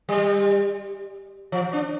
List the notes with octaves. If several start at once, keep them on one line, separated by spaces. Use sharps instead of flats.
G3
F3
D4